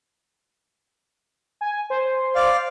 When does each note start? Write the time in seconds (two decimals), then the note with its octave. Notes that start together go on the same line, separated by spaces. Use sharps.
1.61 G#5
1.90 C5
2.35 D5 F5